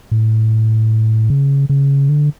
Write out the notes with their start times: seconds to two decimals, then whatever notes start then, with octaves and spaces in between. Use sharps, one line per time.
0.11 A2
1.30 C#3
1.69 C#3
2.09 D3